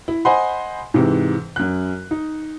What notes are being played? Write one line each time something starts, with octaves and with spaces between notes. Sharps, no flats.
E4
C5 D#5 F#5 G#5 B5 C6
G#2 C3 E3
F#2 F#6
D#4